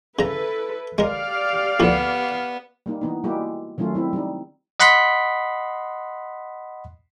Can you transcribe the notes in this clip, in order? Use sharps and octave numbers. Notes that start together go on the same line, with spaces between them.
C#3 E4 A4 B4 A#5
G#3 G4 A#4 D5 F5
D2 A#2 F3 B3
G3 A#3 D#4
E3 B3 D#4
G3 G#3 A#3 E4 F#4 G4
D#3 F#3 A3 C#4 F4
G3 C4 E4
G3 D#4
D#5 F#5 B5 C6 F#6 B6